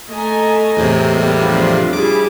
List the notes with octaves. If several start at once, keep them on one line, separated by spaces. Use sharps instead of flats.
A3 D#5 G#5 A#5
E2 A2 C3
G3 A#3 B3 G4
F3 D4 F4
G3 E4 G#4 D6